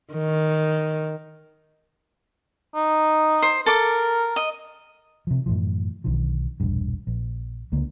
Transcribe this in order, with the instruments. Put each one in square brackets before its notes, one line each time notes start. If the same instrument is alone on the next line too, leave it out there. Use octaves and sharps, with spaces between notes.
[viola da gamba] D#3
[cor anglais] D#4
[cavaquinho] C5
[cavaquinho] A4 D6 [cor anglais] A#4
[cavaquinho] D#5
[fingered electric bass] C3 F3
F#2 A2 E3 F3
B1 D3 D#3 F3
E1 A#1 G2
A#1
C#2 D3 A#3